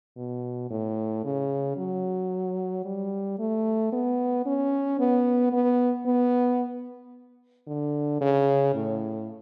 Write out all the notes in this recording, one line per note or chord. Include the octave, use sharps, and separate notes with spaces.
B2
A2
C#3
F#3
G3
A3
B3
C#4
B3
B3
B3
D3
C#3
A2